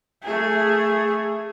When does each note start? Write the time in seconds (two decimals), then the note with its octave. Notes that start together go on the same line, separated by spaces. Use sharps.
0.23 A3 G#4